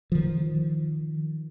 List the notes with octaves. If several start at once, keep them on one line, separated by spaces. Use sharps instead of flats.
D#3 F3